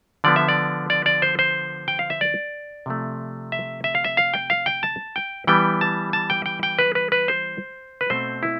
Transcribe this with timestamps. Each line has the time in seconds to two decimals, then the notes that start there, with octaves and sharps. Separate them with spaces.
0.24 D3 F3 B3 D5
0.36 E5
0.48 D5
0.90 D5
1.06 D5
1.22 C5
1.39 C5
1.88 G5
1.99 F5
2.10 E5
2.21 D5
2.86 C3 F3 A3
3.52 E5
3.84 E5
3.95 F5
4.04 E5
4.17 F5
4.34 G5
4.50 F5
4.66 G5
4.83 A5
5.16 G5
5.47 E3 G3 B3 G5
5.81 A5
6.13 A5
6.30 G5
6.46 G5
6.63 G5
6.79 B4
6.95 B4
7.12 B4
7.28 C5
8.01 B4
8.10 B2 A3 C4 C5
8.43 E4